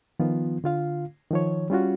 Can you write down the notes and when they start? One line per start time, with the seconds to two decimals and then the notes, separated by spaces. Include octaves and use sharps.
0.20 D#3 F3 B3 F4
0.64 D3 F4 F5
1.31 D#3 F3 C#5
1.70 G3 C#4 F4 F#4